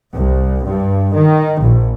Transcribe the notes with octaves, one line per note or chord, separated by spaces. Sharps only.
C2
G2
D#3
A#1